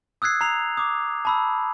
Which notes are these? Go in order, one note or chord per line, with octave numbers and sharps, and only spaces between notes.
D#6 E6 F#6 G#6 C7
A#5 C7 F7
D6 D#6
A5 B5 E6